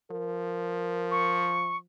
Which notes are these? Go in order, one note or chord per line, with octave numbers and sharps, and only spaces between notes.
F3 A#4
C#6